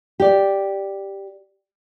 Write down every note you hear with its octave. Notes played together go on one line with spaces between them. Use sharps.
G4 D5